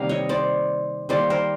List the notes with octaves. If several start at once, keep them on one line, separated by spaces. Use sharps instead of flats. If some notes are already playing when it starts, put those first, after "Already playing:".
Already playing: C3 D#3 G3 A#3 F5
C#5 D#5
C5 D5
D#3 G3 A#3 C5 D5
A#4 C5